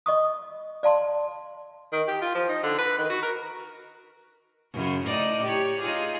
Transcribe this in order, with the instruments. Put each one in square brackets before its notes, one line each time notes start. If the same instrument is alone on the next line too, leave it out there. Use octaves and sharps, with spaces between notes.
[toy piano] D#5 C#6 D#6
D5 F5 A5 C6
[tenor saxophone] D#3
G4
F4
F3
D#4
D3
B4
D#3
F#4
A#4
[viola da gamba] F#2 C#3
A2 D#4 D5
G4 C#5
D#4 F4 G#4